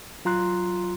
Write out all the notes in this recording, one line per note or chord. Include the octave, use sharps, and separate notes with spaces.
F#3 F4 A#5 C6 F#6